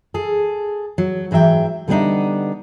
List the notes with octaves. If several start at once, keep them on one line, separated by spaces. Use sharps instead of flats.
G#4 A4
F#3
G#2 E3 F#3 E5 G5
D3 G3 B3 C4 D4 D#4